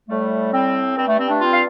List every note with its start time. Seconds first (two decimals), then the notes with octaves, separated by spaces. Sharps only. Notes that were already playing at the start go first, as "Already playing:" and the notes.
0.08 A2 G3 A3
0.52 C4
0.96 G2 G3 C4
1.08 A3
1.18 C4
1.29 A3 D4
1.40 C4 F4
1.52 F5